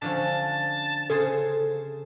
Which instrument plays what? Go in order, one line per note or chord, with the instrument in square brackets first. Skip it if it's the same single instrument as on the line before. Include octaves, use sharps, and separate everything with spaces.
[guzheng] D3 F3 C#4 [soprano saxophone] A5
[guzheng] C#3 G#4 C5 [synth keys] A4